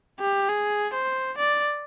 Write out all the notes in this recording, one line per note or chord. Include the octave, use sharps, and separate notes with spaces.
G4
G#4
C5
D5